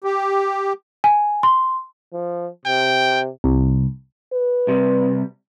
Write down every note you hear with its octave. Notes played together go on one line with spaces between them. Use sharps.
G4
G#5
C6
F3
C3 G5
C2
B4
C2 C3 G3